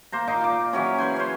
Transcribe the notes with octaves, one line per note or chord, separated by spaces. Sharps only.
A#3 C5 A#5
A#2 D#4 D6
F4 D6
C#3 E3 F#3 C#4
B4 C5 G#5
C#4 C5